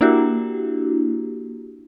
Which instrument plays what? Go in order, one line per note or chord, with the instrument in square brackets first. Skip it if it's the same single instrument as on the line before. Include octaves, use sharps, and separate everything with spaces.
[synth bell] A#3 D4 E4 F#4 G4